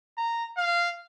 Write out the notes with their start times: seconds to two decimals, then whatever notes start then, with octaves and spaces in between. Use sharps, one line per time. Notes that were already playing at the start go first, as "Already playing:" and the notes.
0.18 A#5
0.57 F5